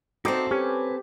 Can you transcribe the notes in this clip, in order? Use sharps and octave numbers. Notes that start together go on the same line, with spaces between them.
C4 D#4 F#4 A4 C5 D5 E5 G5
C#4 G4 B4 G#5